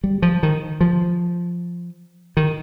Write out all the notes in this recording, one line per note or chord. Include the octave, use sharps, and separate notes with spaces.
G3
F3
D#3
F3
D#3